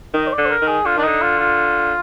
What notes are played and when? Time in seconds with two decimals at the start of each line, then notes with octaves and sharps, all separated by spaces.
0.14 D#3 D#5
0.27 C5
0.33 D3 D5
0.45 C5
0.50 A#4
0.62 D#3
0.68 G#4
0.85 D3 F4
0.97 D#3 D4
1.03 D3 D#4
1.21 F4
1.39 F4